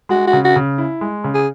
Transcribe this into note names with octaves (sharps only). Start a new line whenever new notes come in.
G#3 F#4
F#4
C#3
F#4
C#3
E4
G#3
C#3
G#4